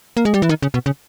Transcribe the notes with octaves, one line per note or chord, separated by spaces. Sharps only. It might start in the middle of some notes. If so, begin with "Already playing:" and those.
A#3
G#3
G3
E3
D#3
C#3
B2
C#3